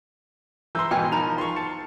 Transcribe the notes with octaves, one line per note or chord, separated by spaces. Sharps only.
E3 A#5 C6 E6 G6
G#2 B2 E3 G5 G#5 F6
F3 D#4 A#4 A#5 B5 F7
F4 C6 C#6
A5 C#7